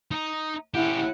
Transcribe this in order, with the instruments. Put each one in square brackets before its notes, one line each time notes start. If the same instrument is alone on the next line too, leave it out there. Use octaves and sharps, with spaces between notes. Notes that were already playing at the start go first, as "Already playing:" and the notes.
[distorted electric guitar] D#4
[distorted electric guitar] C#4 G4 [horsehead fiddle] E4 F#5